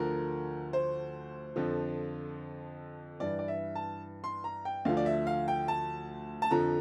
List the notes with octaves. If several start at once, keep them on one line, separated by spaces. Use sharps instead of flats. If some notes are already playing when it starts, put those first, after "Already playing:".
Already playing: D2 D3 F3 A#4
C5
F2 D3 F3
G2 E3 D5
D5
E5
A5
C6
A#5
G5
D2 D3 F3 F5
D5
E5
F5
G5
A5
A5
F2 D3 F3 A#5